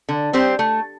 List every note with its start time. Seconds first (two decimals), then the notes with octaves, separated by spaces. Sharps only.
0.09 D3
0.33 G3 C4 G4 C5
0.59 A3